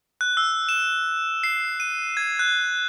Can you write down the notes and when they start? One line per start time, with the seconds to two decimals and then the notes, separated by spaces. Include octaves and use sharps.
0.21 F#6
0.37 E6
0.69 E7
1.44 C7
1.80 D#7
2.17 G#6
2.39 F#6